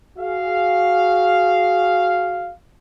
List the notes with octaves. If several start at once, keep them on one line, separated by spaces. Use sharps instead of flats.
F#4 G#4 F5